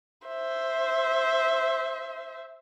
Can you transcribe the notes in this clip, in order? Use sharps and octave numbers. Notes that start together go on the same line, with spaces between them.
C5 E5